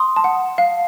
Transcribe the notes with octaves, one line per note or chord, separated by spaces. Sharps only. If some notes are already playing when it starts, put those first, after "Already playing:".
Already playing: C6 D#6
A5
F#5
F5